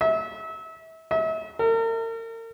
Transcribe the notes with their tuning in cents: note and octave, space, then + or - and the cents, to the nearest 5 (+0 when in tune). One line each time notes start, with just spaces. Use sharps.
E5 -30
E5 -40
A#4 -40